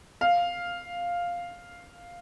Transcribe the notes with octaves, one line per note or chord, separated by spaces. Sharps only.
F5